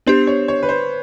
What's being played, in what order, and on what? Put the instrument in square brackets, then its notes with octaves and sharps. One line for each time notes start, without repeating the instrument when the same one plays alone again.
[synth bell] B3 D4 G4 [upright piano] C5
[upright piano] C#5
C#5
B4
C5